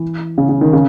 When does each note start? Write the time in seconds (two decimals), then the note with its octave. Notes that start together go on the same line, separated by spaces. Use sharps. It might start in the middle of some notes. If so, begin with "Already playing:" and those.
Already playing: E3
0.38 C#3
0.49 C#3
0.61 D#3
0.73 C#3